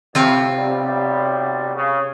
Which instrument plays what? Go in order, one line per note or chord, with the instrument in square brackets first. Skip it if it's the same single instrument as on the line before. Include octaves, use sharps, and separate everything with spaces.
[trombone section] A2 [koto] C3 C4 F4
[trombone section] B1 G3
C#3